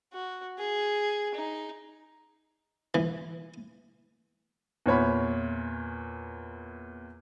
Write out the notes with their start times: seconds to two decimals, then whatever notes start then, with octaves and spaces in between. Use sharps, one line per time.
0.13 F#4
0.58 G#4
1.34 D#4
2.95 E3
4.86 E2 A#2 C#5 B5